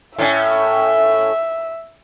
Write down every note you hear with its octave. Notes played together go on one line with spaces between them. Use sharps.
A2 C#4 E5